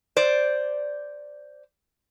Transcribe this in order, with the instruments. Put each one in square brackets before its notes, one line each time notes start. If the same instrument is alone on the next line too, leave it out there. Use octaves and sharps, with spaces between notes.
[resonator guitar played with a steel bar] C5 D5